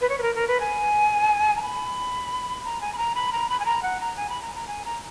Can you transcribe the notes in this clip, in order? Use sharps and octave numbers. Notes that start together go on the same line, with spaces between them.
B4
C#5
B4
A#4
A#4
B4
G#5
A#5
B5
A#5
G#5
B5
A#5
B5
A#5
B5
G#5
A#5
F#5
A#5
G#5
B5
A#5
A#5
G#5
A#5